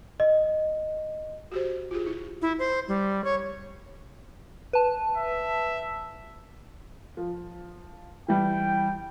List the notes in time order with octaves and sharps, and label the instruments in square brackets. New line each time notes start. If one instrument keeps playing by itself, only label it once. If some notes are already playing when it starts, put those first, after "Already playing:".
[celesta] D#5
[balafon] F#4 G4 C5
F4 G4 G#4
E4
[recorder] E4
C5
G3
C#5
[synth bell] B4 A5
[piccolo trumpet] E5
[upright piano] F3
[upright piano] E3 G3 [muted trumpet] G5